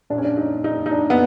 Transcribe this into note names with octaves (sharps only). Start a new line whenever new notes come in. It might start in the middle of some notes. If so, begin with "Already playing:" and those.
A#2 D4
C#4
D4
D#4
D#4
D#4
D4
B3